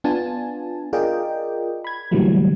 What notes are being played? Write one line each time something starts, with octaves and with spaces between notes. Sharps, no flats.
B3 D4 F4 G#5 A5
F4 G#4 A#4 D5 D#5 G5
B5 G#6
A#2 D3 E3 F#3 G3 A3